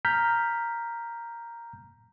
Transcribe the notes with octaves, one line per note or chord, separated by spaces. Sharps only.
A#5 F6 G6 B6